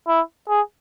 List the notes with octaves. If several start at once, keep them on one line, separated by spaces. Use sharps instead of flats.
E4
G#4